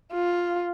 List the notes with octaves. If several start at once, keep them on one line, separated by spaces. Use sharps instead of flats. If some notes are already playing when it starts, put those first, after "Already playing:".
F4